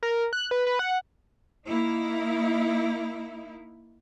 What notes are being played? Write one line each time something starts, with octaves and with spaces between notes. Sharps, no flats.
A#4
F#6
B4
B4
F#5
A#3 D#4 E4